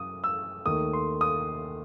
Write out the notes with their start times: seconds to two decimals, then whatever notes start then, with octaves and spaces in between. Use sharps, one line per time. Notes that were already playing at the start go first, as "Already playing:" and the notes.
Already playing: F#2 D#6
0.24 E6
0.66 D#2 D#3 A3 D#6
0.93 C6
1.21 D#6